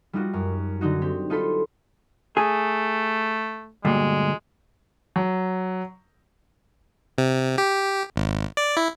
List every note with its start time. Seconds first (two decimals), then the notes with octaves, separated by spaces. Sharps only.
0.13 G3 D#4 F4 F#4
0.33 F#2
0.81 D3 F#3 D#4 F#4
1.02 C4 G4
1.30 D#4 F4 A4 B5 C6
2.37 A3 G#4
3.85 D2 G2 A#2 G#3
5.16 F#3
7.18 C3
7.58 G4
8.16 G#1
8.57 D5
8.77 E4